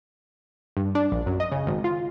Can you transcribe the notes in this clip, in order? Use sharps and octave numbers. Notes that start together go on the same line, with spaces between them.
G2
D4
A#1
F#2
D#5
C#3
G#1
F4